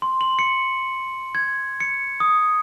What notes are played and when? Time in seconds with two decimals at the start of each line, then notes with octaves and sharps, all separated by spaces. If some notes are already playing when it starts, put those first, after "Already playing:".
0.02 C6
0.21 F#7
0.39 C#7
1.35 G#6
1.80 C#7
2.20 D#6